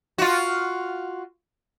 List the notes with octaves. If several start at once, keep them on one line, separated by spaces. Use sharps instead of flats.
F4 F#4